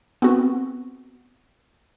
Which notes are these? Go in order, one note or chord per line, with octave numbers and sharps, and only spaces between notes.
B3 C4 F#4